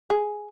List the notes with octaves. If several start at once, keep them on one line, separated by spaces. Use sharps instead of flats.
G#4